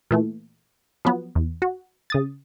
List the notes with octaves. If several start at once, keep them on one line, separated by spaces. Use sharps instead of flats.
A#2 E3 A3
F3 F#3 B3
E2
F#4
C#3 D#6 A6